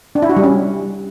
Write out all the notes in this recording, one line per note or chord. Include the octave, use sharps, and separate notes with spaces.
D4
E4
F#4
G3
C#4